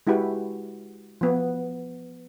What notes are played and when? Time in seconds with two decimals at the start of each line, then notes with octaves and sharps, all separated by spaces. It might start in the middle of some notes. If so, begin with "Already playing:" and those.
0.07 G#3 E4 F#4 G4 B4
1.21 F3 B3